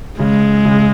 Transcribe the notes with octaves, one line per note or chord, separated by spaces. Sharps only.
C#3 G#3
C#3